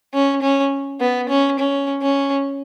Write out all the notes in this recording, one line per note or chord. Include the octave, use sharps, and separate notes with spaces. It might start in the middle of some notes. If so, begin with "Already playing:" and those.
C#4
C#4
B3
C#4
C#4
C#4